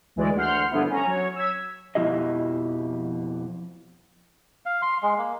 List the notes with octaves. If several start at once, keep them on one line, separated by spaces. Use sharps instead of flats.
D2 E3 G#3 D5
D2 F#5 C6 F6 G6 C7
G2 D3 F3 B3 E4
C#4 A#5
F#3 C#5
E6 G#6 B6
F2 B2 F3 E4 G4 D#5
F5
C6
G#3
A#3